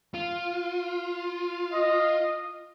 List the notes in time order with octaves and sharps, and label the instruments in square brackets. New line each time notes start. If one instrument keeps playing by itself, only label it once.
[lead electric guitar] F4
[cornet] D#5